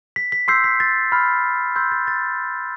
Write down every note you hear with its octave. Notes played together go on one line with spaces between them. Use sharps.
B6
B6
C6 E6 G6 C7
B6
A6
B5 F6
C6 E6 G6
A6
A6